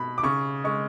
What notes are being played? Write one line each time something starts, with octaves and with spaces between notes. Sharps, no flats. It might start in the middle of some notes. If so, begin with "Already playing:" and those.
Already playing: B2 B5
D6
C#3 C#6
G#3 C#6